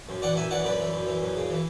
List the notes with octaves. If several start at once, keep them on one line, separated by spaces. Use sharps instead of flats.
F#2
E3 D5 F#5
F#2 E5 G#5
E3 D5 F#5
F#2 B4 D5
E3
F#2
E3
F#2
C#3
E3